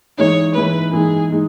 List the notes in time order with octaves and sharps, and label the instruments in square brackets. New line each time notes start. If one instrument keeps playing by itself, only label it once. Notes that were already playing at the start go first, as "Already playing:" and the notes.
[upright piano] E3 G#3 D#4 [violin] C#5
[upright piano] E3 G#3 D#4 [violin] B4
[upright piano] E3 G#3 D#4 [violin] G#4
[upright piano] G#3 D#4